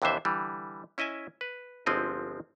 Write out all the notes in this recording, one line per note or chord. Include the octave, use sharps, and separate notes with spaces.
D#2 C3 E3 D4 C5 E5
D3 E3 G3
C#4 E4 D#5 E5 G#5
B4
G1 F3 G#3 C4 E4 D#5